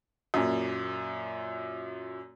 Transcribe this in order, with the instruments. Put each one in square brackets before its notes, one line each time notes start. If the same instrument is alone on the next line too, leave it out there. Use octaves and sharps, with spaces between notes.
[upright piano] F#2 A#2